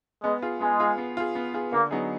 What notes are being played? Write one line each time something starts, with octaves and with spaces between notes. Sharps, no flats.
G#3 B3
F4 G#4
G#3 B3
F4 G#4
B3
F4 G#4
B3
F4 G#4
D3 A#3
F#3 B3 D#4 G#4